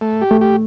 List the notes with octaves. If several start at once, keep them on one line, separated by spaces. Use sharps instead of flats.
A3
G4
A3
G4